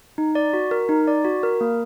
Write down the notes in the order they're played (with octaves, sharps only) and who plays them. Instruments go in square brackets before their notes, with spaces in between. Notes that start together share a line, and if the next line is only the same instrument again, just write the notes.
[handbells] D#4
D5
F#4
A#4
D#4
D5
F#4
A#4
A#3